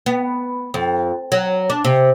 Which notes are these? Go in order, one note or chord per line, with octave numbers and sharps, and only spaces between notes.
B3
F2
F#3
D4
C3